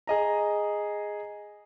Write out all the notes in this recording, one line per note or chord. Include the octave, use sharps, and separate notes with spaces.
G#4 D#5 A#5